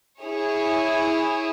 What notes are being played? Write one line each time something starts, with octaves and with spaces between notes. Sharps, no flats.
E4 G#4 C#5